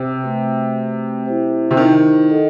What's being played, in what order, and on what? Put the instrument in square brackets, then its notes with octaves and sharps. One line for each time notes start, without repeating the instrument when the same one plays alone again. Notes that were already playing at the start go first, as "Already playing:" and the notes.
Already playing: [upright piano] C3
[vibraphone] A3 C4 F#4 B4
E4 G4 C5
[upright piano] C3
D#3
[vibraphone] D#4 A4 D#5 F#5